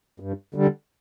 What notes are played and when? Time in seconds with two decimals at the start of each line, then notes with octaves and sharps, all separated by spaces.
0.20 G2
0.54 D3 G3